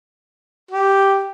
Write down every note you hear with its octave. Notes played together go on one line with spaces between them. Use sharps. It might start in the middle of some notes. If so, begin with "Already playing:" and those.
G4